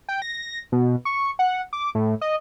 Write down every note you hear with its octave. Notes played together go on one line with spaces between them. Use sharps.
G5
A#6
B2
C#6
F#5
D6
A2
D#5